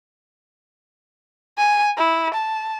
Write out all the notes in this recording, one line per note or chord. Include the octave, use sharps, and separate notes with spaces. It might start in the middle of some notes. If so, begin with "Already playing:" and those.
G#5
E4
A5